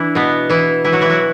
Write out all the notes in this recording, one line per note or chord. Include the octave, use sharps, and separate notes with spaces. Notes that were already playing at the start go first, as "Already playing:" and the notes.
Already playing: E3 D4 E4
B2 B3
E3 E4
E3 E4
F#3 F#4
E3 E4
F#3 F#4